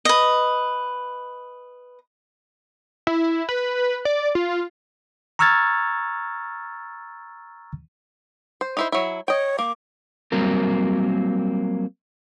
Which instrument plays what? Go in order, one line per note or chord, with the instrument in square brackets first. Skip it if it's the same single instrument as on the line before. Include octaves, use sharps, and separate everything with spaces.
[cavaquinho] B4 D#5
[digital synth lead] E4
B4
D5
F4
[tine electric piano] A#5 C#6 E6 F6 G#6 A6
[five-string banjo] C5
D#4 E4 C5
F#3 E4
[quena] C#5 [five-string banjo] D#5 G5
[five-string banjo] A#3 [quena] D6
[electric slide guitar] F#3 G3 A#3 C4 A#4